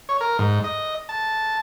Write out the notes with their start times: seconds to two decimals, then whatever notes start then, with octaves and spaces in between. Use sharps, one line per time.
0.09 C#5
0.21 A#4
0.39 G#2
0.64 D#5
1.09 A5